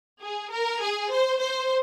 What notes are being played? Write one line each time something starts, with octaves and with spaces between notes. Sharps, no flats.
G#4
A#4
G#4
C5
C5